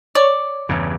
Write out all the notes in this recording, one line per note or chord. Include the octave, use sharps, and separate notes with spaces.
C#5 D5
E2 G2 C#3